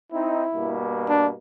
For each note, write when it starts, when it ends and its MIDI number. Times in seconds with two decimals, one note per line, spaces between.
0.12 0.43 60
0.12 0.43 63
0.12 0.78 64
0.54 1.33 43
0.54 1.33 47
0.54 1.33 58
1.09 1.27 62